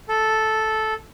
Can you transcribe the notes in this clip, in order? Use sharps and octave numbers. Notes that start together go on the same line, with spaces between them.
A4